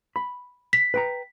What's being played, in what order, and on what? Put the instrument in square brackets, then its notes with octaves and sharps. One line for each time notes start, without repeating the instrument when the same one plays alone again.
[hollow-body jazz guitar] B5
[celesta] B6
[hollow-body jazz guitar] B4 G5 A#5